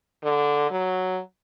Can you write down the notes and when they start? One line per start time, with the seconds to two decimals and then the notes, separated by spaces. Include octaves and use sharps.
0.24 D3
0.71 F#3